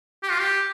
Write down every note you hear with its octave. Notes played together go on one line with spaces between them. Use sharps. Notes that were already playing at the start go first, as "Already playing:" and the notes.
G4
F4
G4